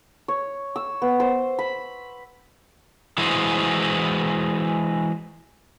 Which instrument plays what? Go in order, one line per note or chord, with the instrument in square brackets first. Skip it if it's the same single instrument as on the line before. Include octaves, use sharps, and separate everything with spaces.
[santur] C#5
E6
B3
C5
B5
[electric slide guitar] E3 G#3 E4 F#4 G#4 C5